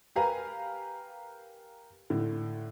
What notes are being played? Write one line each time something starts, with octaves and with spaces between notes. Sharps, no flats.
G4 A#4 B4 F5 G#5 A#5
A2 D3